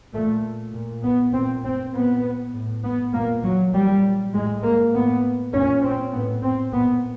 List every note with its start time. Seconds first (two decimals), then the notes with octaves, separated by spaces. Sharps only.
0.14 A#2 A3
0.74 A#2
1.03 B3
1.34 A#2 C4
1.64 C4
1.93 A#2 B3
2.54 A2
2.84 B3
3.14 A#2 A#3
3.44 F#3
3.73 A#2 G3
4.34 A2 G#3
4.64 A#3
4.93 A2 B3
5.53 A#2 C#4
5.83 C4
6.13 A2 B3
6.43 C4
6.73 A#2 B3